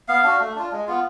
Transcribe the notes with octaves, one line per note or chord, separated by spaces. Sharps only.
B3 F5
D4 F#4
A3
D4 F4
G#3
B3 F4